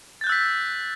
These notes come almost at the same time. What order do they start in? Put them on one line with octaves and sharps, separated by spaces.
A6 G6 F#6 E6 B6